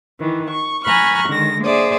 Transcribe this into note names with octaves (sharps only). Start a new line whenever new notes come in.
D#3 E3
C#6
G#5 A#5 B5 C#6 F6 F#6
D3 D#3 G#3 A#6
A#3 G#4 C5 D5 E5 D#6